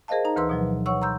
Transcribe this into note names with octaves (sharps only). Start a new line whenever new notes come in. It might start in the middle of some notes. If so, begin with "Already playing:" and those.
G#4 A#4 C5 D#5 F5 A5
D#4 A#5
D2 E3 B4 C6 E6
B2 F3 F#3
C#5 F#5 C#6 E6
A#5 C6 E6 G6